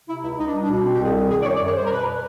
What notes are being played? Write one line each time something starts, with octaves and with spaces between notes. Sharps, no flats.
C3 E4
C#2 E4
C#2 D#4
D4
G3
D4
B2
C4
G4
C2 G#4
G3 G#4
D#3 G#4
D5
F#2 C#5
D5
F#2 C#5
G3 C5
A#4
B2 B4